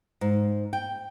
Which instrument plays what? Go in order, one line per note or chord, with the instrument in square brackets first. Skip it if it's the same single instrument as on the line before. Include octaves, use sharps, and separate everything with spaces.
[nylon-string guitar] G#2
G5